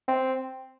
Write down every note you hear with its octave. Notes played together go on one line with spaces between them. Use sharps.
C4